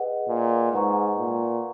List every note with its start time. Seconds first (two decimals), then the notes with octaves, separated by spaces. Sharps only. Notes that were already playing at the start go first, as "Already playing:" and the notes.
Already playing: G#4 B4 D#5 F#5
0.28 A#2
0.72 G#2 B4 F#5 A#5 C#6
1.18 A#2